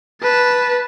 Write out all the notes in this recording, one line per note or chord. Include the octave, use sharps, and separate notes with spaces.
B4 A5